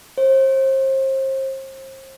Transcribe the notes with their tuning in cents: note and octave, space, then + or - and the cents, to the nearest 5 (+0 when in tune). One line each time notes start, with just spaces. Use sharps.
C5 +35